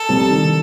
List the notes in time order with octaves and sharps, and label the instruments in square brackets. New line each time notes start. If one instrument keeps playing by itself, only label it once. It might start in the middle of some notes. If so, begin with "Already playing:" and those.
Already playing: [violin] A4
[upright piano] C2
D#3